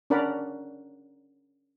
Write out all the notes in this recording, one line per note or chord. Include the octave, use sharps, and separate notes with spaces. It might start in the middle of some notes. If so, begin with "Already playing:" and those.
C#4 D4 A#4 D5 F#5 B5